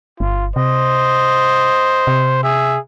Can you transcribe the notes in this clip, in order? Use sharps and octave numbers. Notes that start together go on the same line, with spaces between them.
G1 F4
C3 C5 D#5
C3
G#4 E5